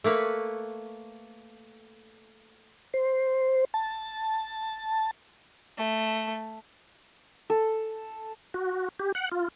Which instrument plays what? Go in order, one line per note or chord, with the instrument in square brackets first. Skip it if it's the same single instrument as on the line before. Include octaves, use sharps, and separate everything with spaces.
[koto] A3 A#3 B4 C#5
[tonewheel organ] C5
A5
[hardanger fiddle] A3
[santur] A4
[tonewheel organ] F#4
G4
F#5
F4